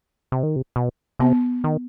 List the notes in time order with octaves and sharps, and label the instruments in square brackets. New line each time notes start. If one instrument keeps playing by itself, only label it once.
[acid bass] C3
D#3
C3
B2
[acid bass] C3 [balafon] B3
[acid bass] D#3